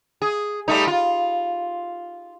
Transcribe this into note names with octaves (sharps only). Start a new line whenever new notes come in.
G#4
G3 A3 D#4
F4